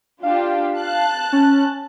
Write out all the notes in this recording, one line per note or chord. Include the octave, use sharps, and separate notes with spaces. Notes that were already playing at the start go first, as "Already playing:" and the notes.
D4 F4 G4 F5
A5 F#6
C#4